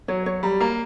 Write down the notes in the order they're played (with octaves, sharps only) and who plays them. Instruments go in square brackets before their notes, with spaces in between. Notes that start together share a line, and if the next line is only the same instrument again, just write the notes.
[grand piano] F#3 [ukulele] C#5
[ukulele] C#5
[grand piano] G3 [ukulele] A#5
[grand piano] A#3 [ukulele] A#5